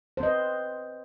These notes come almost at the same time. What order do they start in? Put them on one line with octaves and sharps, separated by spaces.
C5 C4 D#5 B4